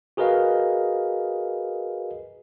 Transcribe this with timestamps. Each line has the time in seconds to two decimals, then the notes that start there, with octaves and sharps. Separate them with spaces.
0.17 F#4 G#4 A#4 B4 D#5 F5